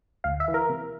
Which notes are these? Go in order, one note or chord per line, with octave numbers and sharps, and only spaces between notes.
D2 F5
E5
E3
A#4
C3